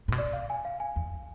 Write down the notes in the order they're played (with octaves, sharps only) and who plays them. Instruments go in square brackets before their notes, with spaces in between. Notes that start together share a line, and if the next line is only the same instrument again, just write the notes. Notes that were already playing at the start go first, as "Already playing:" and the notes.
[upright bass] A2
B2
[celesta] D5
F5
G#5
F5
G#5
[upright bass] E2